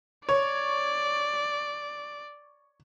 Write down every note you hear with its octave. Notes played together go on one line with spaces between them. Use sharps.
C#5 D5